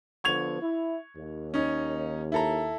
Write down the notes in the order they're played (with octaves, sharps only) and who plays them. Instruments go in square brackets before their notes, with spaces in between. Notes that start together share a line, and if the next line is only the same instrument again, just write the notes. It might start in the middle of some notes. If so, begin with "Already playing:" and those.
[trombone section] D3 F3 B3 [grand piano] C#6 G#6 F7
[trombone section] E4
D#2
[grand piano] C#4 D#4
E4 A4 A#5